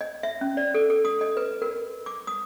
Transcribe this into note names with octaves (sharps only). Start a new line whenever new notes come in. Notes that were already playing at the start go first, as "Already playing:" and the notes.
D#5
E5
C#4
D5
A4
A4
D#6
D#5
B4
A#4
D6
D#6